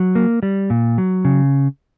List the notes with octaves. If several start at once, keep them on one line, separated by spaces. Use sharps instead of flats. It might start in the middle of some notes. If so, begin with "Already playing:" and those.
Already playing: F#3
A#3
G3
A#2
F#3
C#3